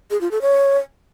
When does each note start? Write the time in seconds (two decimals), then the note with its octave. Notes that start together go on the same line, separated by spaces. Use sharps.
0.11 G#4
0.21 F4
0.31 A4
0.42 C#5